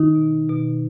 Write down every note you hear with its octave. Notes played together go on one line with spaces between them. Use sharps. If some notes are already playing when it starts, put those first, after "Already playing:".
Already playing: D#3 D#4
B2
B2